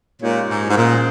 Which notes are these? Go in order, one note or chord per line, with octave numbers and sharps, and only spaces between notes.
A#2 C#3 G#3 D#4 G4 C#5
G#2
G#2
A#2 F3 G#3 C#4 G#4 C5